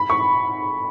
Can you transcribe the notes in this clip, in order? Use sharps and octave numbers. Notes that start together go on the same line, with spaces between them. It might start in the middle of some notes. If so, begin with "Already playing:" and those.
Already playing: B5
C#6